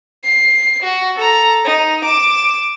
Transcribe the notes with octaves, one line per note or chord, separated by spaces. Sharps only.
C7
F#4
A4 A#5
D#4
D6 E7